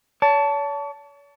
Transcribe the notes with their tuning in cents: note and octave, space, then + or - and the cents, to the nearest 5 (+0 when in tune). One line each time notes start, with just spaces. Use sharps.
C#5 +40 A5 +0